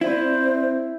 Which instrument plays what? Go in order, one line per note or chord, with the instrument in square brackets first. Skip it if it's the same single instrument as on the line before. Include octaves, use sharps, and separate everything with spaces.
[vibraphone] C4 D5 [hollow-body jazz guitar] E4 [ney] C5